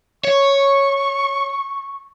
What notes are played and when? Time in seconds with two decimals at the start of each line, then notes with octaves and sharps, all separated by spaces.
0.25 C#5 C#6